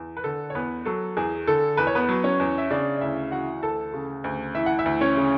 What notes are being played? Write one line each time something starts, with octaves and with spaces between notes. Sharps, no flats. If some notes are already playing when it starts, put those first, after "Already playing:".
Already playing: E2
B4
D3 A4
C#5
E2 B3 B4
F#3 A4
E2 G#4
D3 A4
E2 B4
C#5
B3 B4
F#3
C#4 C#5
E2
E5
C#3 D4 D5
D5
D2 E4 E5
E3 F#4 F#5
D2 A4 A5
C#3
D2
E3 E5
F#5
E4 E5
D2
C#4 C#5
C#3